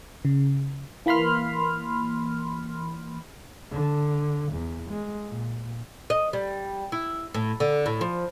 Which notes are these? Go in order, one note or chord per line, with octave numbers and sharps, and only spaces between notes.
C#3
E3 A#3 B5 C6 F6
D3
E2
G#3
A#2
D#5
G3
E4
A2
D3
A2
F3